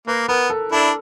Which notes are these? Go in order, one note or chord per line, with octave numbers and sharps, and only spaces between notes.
A#3 B4
B3 A#4
A4
D4 E4 A4